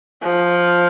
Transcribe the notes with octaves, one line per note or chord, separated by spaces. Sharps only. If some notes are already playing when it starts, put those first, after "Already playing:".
F3